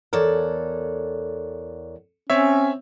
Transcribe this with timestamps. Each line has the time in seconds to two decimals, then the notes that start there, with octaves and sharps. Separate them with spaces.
0.13 E2 A4 A#4 C#5 D5 F#5
2.30 C4 C#4 C#5 E5